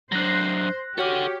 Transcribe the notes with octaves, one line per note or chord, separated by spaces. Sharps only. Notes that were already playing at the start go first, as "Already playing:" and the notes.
F#3 D4 C5 F#6 A#6
F#4 G4 A4 C#5 F#5 F6